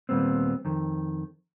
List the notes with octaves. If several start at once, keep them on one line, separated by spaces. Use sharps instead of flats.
D#2 A#2 G3 B3 C4
F2 D#3